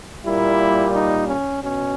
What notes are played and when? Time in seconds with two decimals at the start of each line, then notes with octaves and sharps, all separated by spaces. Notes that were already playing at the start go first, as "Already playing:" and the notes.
0.25 A#2 G3 A#3 E4
0.94 D#4
1.28 C#4
1.62 B2 C#4